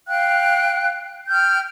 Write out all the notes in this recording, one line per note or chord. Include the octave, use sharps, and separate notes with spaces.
F5 G5 F#6
G5 F6 G6